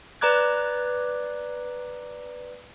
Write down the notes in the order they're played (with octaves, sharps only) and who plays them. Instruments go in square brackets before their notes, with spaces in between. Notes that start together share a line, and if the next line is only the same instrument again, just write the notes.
[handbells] B4 D5 A#5 D6 F#6 G#6